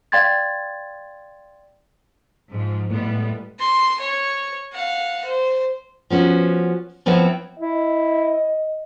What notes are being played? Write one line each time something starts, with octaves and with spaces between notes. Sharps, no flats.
D5 F5 G5 C6 G#6 A6
G#2 F3
A2 G3 G#3 B3
C6
C#5
F5 F#5
C5
F3 B3 C#4 F#4
F3 B3 C4 E4 C#5 E5
E4 D#5